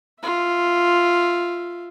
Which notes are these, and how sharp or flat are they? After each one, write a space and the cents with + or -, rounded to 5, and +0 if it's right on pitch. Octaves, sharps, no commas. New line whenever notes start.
F4 +0 E5 +0